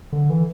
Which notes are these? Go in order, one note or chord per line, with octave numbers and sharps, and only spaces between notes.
D3
E3